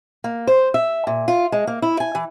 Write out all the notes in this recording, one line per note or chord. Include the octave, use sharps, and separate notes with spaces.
A#3
C5
E5
A#2
F4
G#3
A#3
E4
G#5
E3